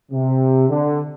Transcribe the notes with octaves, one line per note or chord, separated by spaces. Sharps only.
C3
D3